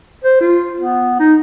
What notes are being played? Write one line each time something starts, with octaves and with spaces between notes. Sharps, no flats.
C5
F4
B3
D#4